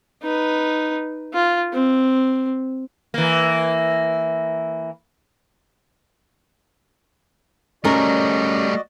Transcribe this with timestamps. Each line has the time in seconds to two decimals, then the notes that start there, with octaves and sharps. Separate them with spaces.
0.23 D#4 B4
1.34 F4
1.73 C4
3.14 E3 A#3
7.84 G3 A3 C#4 F#4 A#4 D5 D#5